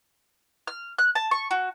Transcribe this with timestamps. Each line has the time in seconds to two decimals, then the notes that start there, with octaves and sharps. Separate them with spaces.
0.67 F6
0.99 F#6
1.15 A5
1.31 C#6
1.51 F#4